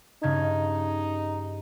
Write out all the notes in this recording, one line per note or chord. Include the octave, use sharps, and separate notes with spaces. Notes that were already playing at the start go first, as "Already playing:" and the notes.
G2 C#3 D#4 G#6